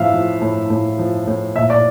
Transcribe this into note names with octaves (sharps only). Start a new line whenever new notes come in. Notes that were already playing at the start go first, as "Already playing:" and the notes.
Already playing: A2 F3 E5 F5
F3
A2
A2
F3
A2
A#2 E5
D5